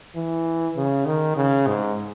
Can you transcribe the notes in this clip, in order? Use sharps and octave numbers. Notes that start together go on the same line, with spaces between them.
E3
C#3
D#3
C#3
G#2